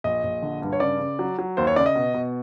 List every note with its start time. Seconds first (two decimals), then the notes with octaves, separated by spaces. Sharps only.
0.04 A#1 D#5
0.23 A#1
0.42 D3
0.62 G2
0.73 C#5
0.80 C#3 D5
1.00 C#3
1.19 F#3
1.39 F#3
1.57 D#2 C5
1.67 C#5
1.76 C#3 D5
1.86 D#5
1.95 B2
2.14 B2